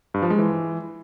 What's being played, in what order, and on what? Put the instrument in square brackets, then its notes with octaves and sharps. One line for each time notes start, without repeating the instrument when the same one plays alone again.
[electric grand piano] G2
F3
G#3
E3